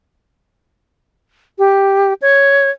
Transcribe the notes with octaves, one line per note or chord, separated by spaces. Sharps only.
G4
C#5